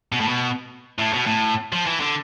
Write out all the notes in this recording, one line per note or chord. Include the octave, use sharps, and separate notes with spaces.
B2
A2
B2
A2
B2
A2
F3
E3
D3